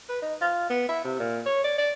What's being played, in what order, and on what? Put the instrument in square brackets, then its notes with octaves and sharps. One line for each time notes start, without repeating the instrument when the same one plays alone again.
[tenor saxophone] B4
D#4
F4
B3
E4
C3
A#2
C#5
D5
D5